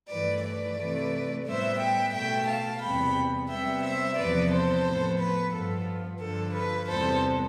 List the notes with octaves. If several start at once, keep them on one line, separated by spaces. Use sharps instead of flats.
G2 E3 A3 B4 D5
B4 D5
C3 E3 A3
A2 G3 B3 C5 E5
E5 G5
B2 A3 E5 G5
F5 A5
E2 C3 G3 B3 G5 B5
C3 G3 B3 E5 G5
C5 E5
E2 C3 F3 B3 B4 D5
A4 C5
A2 F3 B3
B4
G2 F3 B3 A4
G2 D3 F3 A4
B4
E2 C3 G3 B3 A4 C5